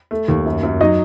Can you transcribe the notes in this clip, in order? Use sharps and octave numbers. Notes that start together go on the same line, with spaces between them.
A3
D#2
F#2
F#2
F#3 D#4 D#5